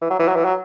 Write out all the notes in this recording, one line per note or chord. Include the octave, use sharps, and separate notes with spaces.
E3
F#3
E3
F#3
E3
F#3